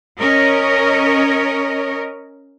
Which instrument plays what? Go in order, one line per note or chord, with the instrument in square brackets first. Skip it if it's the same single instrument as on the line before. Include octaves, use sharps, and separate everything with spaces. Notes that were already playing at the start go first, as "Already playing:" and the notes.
[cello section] C#4 A#4 C#5 D#5